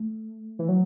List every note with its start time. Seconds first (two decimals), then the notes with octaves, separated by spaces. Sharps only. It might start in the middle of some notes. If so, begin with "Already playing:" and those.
Already playing: A3
0.59 E3
0.69 F#3